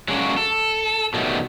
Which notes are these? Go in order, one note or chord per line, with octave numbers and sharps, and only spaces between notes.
F#3 G#3 A#3 C#4 D4 F#4
A4
B2 D#3 F#3 G3 A3